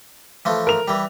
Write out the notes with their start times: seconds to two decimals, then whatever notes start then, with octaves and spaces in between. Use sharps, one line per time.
0.45 E3 F3 A3
0.67 A#4 F7
0.88 E3 G3